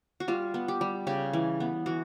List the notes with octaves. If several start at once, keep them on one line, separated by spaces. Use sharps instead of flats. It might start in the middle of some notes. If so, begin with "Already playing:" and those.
F#4
G3 F4
B3
G4
G3
C#3 G4
E3
B3
E3 F#4